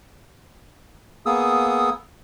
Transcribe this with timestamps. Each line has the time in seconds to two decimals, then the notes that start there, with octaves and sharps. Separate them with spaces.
1.26 A#3 B3 G#4 D#6 E6